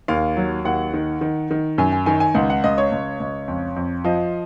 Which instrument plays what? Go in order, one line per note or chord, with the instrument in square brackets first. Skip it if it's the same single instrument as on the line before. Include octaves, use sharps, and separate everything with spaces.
[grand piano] D#2 F5
F#3
D#2 F#5
D#3
D#3
D#3
F#2 G#5
G#5
D#3 G#5
G#5
C#2 F#5
F#5
C#2 D#5
C#5
C#2
C#2
F2
F2
F3 D#5